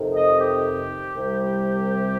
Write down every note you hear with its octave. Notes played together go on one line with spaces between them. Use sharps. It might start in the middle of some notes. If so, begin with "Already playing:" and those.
Already playing: F2 C3 D#3
D#5
G4
C2 C3 G3